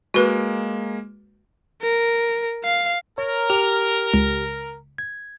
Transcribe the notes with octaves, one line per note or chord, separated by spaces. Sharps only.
G#3 A#3 F#4 B4
A#4
F5
A#4 C#5
G4 F6
C#2
G#6